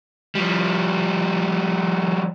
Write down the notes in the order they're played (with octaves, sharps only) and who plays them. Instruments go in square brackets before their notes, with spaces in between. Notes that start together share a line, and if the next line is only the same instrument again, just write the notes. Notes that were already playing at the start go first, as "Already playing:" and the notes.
[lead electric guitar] F3 G3